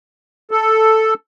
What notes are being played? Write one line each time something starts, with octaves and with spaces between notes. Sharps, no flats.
A4